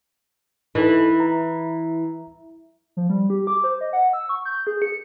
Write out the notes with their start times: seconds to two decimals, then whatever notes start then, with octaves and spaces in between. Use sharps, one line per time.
0.75 E3 D#4 A4 B4
1.20 A#5
2.97 F3
3.09 G3
3.30 G4
3.47 D6
3.64 C5
3.81 D#5
3.93 F#5
4.13 E6
4.29 C#6
4.45 G6
4.67 G#4
4.82 C#7